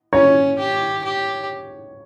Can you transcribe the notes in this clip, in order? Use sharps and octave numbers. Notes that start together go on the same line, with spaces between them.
C#4 C#5
G4
G4